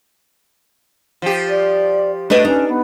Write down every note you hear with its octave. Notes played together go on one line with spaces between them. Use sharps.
F3 G4
D5
A3 D4 B4 D#5
C#4 D#4
B3